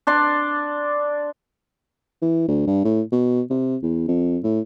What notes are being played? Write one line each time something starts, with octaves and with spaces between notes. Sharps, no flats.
D4 D5 C6
E3
D2
G2
A2
B2
C3
E2
F2
A2